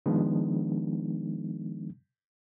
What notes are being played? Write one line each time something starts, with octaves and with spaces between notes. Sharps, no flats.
D#3 F3 G#3 B3 D4 D#4